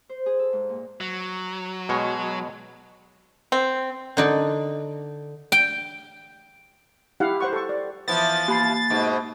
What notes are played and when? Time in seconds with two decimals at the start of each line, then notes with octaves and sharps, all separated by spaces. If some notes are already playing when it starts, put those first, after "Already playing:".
0.09 C5
0.26 G#4
0.39 A4
0.53 G#2
0.69 A#2
1.01 F#3
1.89 B2 G#3 C#5
3.52 C4
4.17 D3 D#4 D5
5.52 G5
7.20 E4 G4 F5 F#5
7.41 C5 F#5 C#6
7.53 A4 C#6
7.69 D5
8.08 E3 F3 B3 A6
8.48 A#3 B5 C7
8.90 G#2 B2